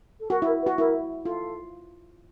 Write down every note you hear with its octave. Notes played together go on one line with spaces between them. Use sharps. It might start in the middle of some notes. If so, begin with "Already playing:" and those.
A4
F#4 A#4
E4 A#4
B4
F#4
E4 A#4
F4 A4